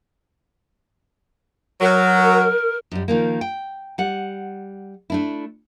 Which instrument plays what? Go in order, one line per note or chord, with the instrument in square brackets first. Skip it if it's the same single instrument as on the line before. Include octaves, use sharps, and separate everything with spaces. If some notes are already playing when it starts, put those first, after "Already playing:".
[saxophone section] F#3 [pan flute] A#4
[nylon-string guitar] F#2 G3
D#3 F3 A#3
G5
G3 F#5
A3 D4 E4